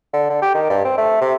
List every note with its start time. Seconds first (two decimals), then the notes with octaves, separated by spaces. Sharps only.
0.13 D3
0.30 D3
0.42 G4
0.55 D#3
0.70 G2
0.85 C4
0.98 A3
1.21 C3